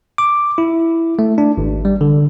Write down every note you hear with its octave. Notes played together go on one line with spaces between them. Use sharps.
D6
E4
A3
D4
G#1
G3
D3